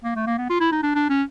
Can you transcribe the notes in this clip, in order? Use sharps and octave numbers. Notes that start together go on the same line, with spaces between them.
A#3
A3
A#3
B3
F4
E4
D#4
D4
D4
C#4